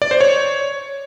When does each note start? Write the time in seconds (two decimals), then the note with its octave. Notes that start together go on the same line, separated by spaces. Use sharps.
0.02 D5
0.11 C5
0.21 C#5